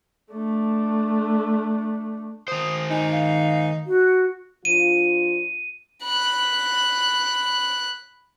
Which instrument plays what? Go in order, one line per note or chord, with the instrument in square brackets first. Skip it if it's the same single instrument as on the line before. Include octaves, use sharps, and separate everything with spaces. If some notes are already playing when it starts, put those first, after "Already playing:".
[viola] A3 D4
[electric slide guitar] D#3 C5 [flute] D#6
[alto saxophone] D#4 [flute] G#5
[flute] F5
F#4
[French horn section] F3 D4 F4 [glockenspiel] D#7
[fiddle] B5 F#6